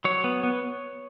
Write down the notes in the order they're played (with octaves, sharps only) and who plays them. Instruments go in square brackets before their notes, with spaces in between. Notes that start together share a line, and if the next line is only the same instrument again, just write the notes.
[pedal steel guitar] F#3 C#5
B3
B3